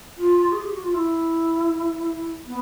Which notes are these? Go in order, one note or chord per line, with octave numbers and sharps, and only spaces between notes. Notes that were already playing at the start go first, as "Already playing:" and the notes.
F4
G#4
G4
F#4
F4
E4
B3